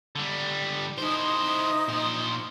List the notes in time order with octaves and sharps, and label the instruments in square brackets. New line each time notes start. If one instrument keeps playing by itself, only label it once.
[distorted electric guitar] D3 G3
[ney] D#4 [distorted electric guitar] E4 C5
[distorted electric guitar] A#2 C5